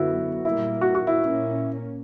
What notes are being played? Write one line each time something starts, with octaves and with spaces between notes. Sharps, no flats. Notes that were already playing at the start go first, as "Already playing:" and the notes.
Already playing: F#2 D3 F#3 B3 E4 F#4
A#2 G3 A#3 E4
F#4
F#4
E4
A#2 A#3 C#4